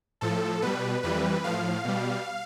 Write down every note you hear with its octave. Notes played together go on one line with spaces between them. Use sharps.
A2 F3 A4
B2 G3 B4
F2 E3 G3 B4
A2 F3 F5
B2 G3